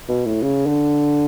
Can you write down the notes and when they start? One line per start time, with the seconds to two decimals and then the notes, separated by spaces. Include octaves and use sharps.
0.09 B2
0.26 A2
0.42 C#3
0.66 D3